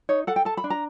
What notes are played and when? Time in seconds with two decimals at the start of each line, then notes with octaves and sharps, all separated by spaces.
0.09 D#4 C#5
0.27 A4 F#5
0.36 G5
0.45 A4 A5
0.57 B5
0.64 D4
0.70 A#5